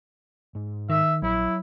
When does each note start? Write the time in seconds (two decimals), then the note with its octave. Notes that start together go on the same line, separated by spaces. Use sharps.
0.55 G#2
0.90 D#3 E5
1.23 A#1 F#3 E4